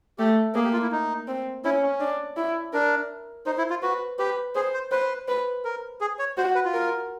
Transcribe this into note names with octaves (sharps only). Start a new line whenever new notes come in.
A3 G4
A#3 G#4
G4
F4
E4
D#4
C4
C#4 E4
C#4
D4
E4
D4 A#4
D#4 C5
E4
F4
F#4 B4
G4 B4
G#4 C5
C5
B4 C5
B4
A#4
G#4
C#5
F#4 C5
B4
F4
A#4